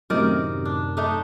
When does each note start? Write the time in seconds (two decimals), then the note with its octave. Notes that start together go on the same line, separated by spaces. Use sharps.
0.10 F#2 A2 C3 D#3 A#4 D5
0.65 D4
0.97 A3 D4 D#4